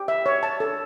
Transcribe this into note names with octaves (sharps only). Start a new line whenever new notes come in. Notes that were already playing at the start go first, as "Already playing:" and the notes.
Already playing: G4
E5
C#5
A5
A4